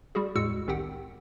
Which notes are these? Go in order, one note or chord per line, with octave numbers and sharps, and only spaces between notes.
G3 F#4 G#4
E2 A2 G#3 F#4 E6 C#7
C2 D#3 C4 G4 F#5 G5